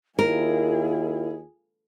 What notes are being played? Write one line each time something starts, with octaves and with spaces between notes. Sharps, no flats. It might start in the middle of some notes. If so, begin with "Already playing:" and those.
D#2 E4 F4 G#4 A#4